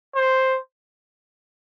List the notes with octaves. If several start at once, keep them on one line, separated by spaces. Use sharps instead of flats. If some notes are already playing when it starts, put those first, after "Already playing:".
C5